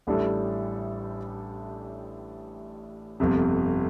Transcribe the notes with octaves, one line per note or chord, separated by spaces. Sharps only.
A1 A2 G3 D4 A4
G1 F2 C3